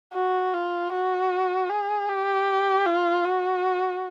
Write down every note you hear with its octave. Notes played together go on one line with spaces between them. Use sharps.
F#4
F4
F#4
G#4
G4
F4
F#4